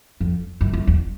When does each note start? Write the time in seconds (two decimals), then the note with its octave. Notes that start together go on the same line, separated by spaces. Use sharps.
0.20 F2
0.61 F#2
0.73 F#2
0.87 E2